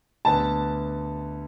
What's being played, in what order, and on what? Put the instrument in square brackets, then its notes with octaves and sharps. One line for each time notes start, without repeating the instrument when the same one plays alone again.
[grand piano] D2 D3 B3 [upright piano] A5